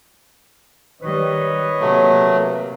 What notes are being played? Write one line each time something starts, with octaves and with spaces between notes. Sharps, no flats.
D#3 G3 B4 C#5 D#5
C3 F#3 A3 A#3